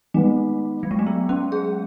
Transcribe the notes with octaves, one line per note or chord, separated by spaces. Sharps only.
D#3 G#3 A3 B3
F#3
G#3
A3
B3
C#4
G#4